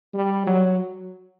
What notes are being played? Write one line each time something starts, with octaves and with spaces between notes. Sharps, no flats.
G3
F#3